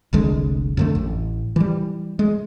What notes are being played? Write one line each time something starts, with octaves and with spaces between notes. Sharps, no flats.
F1 C2 D3 G#3
F2 D3 A3
A1
E3 G3
G#3